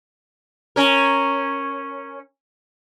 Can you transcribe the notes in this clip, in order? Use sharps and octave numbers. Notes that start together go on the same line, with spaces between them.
C#4 A#4